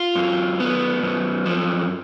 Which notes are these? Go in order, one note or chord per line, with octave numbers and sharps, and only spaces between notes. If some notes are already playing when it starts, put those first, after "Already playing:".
Already playing: F4
F#2
B3
F#2
F3